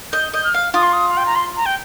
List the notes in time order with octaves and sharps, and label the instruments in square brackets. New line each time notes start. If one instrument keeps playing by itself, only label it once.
[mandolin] D#5 [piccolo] G6
[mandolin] D#5 [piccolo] G6
[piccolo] F6
[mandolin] F5
[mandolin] F4 [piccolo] D#6
[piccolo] C6
D#6
F5
G5
A#5
C6
A#5
G5